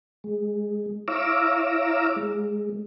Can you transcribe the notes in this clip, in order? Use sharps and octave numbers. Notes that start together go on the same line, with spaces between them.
G#3
E4 C#5 F5 A#5 D6 E6
G#3